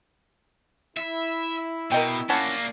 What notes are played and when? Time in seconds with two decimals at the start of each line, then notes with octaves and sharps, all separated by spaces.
0.97 E4 E5
1.92 B2 A#4 D#5 G5
2.30 A#3 C#4 D4 F#5 A5